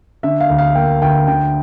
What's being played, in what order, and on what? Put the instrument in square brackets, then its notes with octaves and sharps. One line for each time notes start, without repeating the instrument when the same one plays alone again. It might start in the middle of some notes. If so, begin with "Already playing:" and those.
[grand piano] D3 E5
F5
D2
F5
A#3 G5
D2 G5
D3 G5